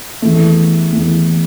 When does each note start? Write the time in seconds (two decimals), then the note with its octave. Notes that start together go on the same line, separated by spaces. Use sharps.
0.22 E2 E3 A3
0.92 E2 E3 A3